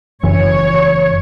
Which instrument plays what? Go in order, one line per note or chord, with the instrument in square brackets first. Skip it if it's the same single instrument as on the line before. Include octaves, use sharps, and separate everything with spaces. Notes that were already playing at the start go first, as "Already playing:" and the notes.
[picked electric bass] F#1 F#2 E3 [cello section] C#5